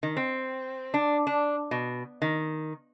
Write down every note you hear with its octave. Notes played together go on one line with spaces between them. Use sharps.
D#3
C4
D4
D4
B2
D#3